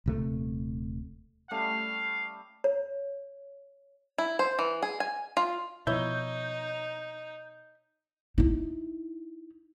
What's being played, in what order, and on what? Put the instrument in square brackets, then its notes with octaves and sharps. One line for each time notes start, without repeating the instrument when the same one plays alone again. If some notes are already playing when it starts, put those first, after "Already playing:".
[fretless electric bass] D#1 C3 A3
[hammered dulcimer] G3 A3 C#4 [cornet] F5
[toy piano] C#5
[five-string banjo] E4
C5
E3
G#4
G#5
F4
[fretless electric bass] B2 F3 [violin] D#4 [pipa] E4 C#5 [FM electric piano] G6
[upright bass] D#4 E4